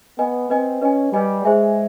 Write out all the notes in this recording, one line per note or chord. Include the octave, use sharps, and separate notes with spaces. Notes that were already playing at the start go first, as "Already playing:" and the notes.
B3 B4 D#5 G#5
C4 B4 D#5 G#5
C#4 B4 D#5 G#5
G3 B4 D#5 G#5
G#3 G#4 C5 E5 G#5